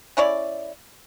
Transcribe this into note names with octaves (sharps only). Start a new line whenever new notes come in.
C#4 E4 C#5 D5